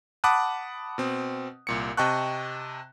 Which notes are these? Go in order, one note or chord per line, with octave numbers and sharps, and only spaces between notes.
F#5 A5 B5 D6 D#6 F#6
B2 C4
C2 A#2 C#7
C3 D#5 G5 A5 C#6 F#6